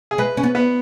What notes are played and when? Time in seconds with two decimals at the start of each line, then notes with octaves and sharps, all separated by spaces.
0.11 G#4
0.18 G#3 B4
0.37 C#4
0.43 B3
0.55 B3